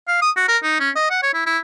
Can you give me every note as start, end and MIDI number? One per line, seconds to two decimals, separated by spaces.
0.08 0.17 77
0.22 0.31 87
0.37 0.45 66
0.48 0.58 70
0.63 0.76 63
0.80 0.90 61
0.96 1.10 75
1.10 1.19 78
1.23 1.33 73
1.34 1.44 64
1.46 1.59 64